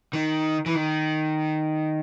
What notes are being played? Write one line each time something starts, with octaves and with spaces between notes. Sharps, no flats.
D#3
E3
D#3